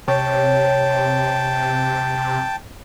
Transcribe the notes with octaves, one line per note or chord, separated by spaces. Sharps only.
C3 C#5 G5 A5